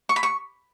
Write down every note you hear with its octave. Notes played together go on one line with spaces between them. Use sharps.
C#6
B5
C#6